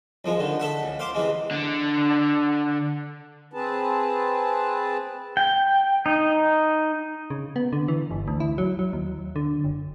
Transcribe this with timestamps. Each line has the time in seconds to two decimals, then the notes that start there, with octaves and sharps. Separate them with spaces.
0.25 C2 F3 G#3
0.39 D3 D#3
0.60 A4 E5 F#5
0.83 C#2
0.99 C5 F5 C6 D6
1.15 C3 E3 G#3
1.51 D3 D4
3.53 C4 G#4 B4 A5
5.37 G5
6.06 D#4
7.30 C#3
7.56 B3
7.73 D3
7.88 E3
8.11 G1
8.28 D2
8.40 E4
8.58 F#3
8.79 F#3
8.93 D#2
9.36 D3
9.64 F#1